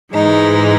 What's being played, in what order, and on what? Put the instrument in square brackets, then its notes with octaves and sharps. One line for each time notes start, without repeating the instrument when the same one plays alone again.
[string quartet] G#2 E3 G#3 D#4